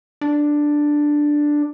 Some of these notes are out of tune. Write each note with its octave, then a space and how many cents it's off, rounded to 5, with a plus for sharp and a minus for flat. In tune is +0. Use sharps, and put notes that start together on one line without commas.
D4 +5